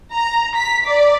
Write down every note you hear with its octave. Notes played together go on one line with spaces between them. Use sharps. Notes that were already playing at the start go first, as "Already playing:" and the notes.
A#5
B6
D5